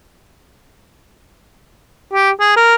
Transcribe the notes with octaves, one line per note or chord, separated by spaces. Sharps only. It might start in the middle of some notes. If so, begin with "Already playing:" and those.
G4
G#4
A#4